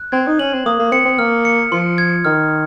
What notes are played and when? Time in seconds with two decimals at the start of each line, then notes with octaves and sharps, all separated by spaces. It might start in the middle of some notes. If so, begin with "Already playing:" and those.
Already playing: F#6
0.12 C4 G#6
0.27 D#4
0.39 C#4 F#7
0.53 C4
0.65 A#3 D#6
0.79 A#3
0.92 C4 C#7
1.05 C4
1.18 A#3 F6
1.45 C#7
1.72 F3 C6
1.98 G#6
2.25 D#3 F6